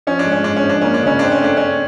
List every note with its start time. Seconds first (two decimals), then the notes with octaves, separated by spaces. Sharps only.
0.07 F3 C#4
0.19 D4
0.26 G#3
0.32 C#4
0.44 G#3 D4
0.56 C#4
0.64 F3
0.69 D4
0.82 A#3 C#4
0.94 D4
1.03 C#3 C#4
1.19 C4 D4
1.32 C#4
1.41 A3 D4
1.57 A3 C#4